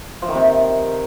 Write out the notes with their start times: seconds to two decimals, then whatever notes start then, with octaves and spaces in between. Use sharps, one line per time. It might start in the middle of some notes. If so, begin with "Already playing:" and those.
0.22 F3
0.29 D#3
0.35 C3